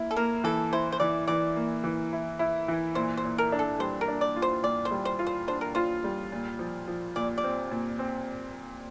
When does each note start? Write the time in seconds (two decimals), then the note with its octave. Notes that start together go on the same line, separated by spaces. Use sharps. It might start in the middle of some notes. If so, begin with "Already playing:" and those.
Already playing: A#3 E4
0.11 A4
0.16 A#3 A#4
0.44 E3 A4
0.73 E4 C5
0.92 C5
1.00 E3 D5
1.28 E3 D5
1.56 A#3
1.84 E3
2.13 E4
2.39 E4
2.68 E3
2.95 A#2 C5
3.17 C5
3.24 A#2
3.38 A#4
3.52 D4
3.59 A4
3.79 G3 C5
4.01 A#4
4.08 D4
4.21 D5
4.36 F4
4.42 C5
4.63 A#2 D5
4.85 C5
4.91 G3
5.05 C5
5.19 F4
5.27 C5
5.48 D4 C5
5.61 A#4
5.75 F4 C5
6.04 G3
6.32 A#2
6.59 F3
6.88 F3
7.16 A#2 D5
7.38 D5
7.44 C4
7.71 A#2
7.99 C4